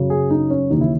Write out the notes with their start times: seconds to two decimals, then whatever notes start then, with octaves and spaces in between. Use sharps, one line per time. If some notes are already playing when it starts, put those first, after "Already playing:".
Already playing: F#2 C#3 F#3
0.10 G#4
0.31 D#4
0.50 C#4
0.70 D#2 C#3 E3 D#4
0.81 E4